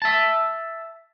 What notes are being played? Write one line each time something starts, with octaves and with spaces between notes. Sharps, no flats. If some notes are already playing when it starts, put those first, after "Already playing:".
E5 A5